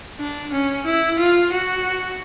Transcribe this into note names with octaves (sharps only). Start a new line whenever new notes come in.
D4
C#4
E4
F4
F#4